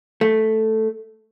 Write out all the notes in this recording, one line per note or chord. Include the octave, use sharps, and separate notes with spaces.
A3